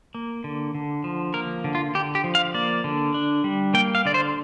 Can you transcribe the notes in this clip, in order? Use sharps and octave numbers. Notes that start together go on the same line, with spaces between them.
A#3
D3
D3
F3
A#3 A#4
D3
F4
D3 G4
G4
F3
F5
A#3 D5
D3
D4
G3
A#3 G5
F5
D3 D5
C5